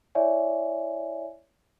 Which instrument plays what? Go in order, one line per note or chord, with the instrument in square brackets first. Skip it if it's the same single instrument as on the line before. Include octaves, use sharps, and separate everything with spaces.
[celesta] E4 C#5 D5 E5 G#5